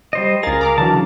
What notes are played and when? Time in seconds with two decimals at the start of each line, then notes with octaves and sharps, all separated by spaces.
0.13 G3 C5 D#5
0.43 C#2 G#4 A#4 F5 A6
0.61 A#5 D6 F6
0.78 D3 E3 F#3 A5
0.92 C#3